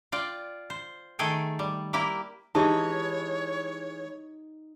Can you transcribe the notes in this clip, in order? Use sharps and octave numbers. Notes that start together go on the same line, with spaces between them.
F4 D5 G5
C5
D#3 A3 G#4 A4 G5 G#5
G3
A#3 E4 G4 A#4
E3 G#3 D#4 G4 C#5 A5